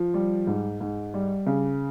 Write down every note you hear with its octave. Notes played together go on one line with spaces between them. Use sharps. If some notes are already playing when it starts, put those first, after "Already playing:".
Already playing: F3
G3
G#2
G#2
G3
C#3